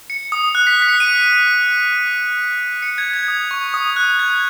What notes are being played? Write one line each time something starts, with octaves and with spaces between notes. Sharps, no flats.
C#7
D#6
F#6
B6
B6
C#7
D#7
C#7
G#6
G#6
D#6
C#6
D#6
F#6
G#6